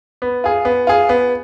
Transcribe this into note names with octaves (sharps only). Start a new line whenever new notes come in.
B3
F4 G#4
B3
F4 G#4
B3